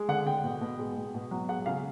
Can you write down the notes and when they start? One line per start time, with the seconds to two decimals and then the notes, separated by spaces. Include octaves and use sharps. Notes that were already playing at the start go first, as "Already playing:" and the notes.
Already playing: G#3
0.08 D3 F#5
0.26 D3 G5
0.44 B2
0.61 B2
0.79 G#3
0.97 B2
1.15 B2
1.31 F#3
1.49 G#3 F#5
1.66 C#3 F5